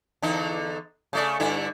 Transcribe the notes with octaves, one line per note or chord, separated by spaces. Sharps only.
E2 D3 D#4
C#3 A3 D5
G2 D3 E4